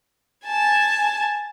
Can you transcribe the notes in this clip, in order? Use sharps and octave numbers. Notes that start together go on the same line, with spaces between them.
G#5 A5